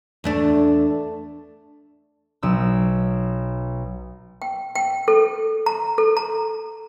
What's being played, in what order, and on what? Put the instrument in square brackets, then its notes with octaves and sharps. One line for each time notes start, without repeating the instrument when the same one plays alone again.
[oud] E2 A3 D4
[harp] B1 E6
[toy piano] G5
G5
A4
A#5
A4
A#5